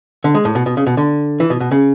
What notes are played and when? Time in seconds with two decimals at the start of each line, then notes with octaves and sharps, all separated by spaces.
0.24 D3
0.35 G#3
0.45 A2
0.55 B2
0.66 B2
0.77 C#3
0.87 B2
0.97 D3
1.40 E3
1.50 B2
1.60 B2
1.72 C#3